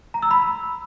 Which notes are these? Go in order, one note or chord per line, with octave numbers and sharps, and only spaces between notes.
A#5
E6
B5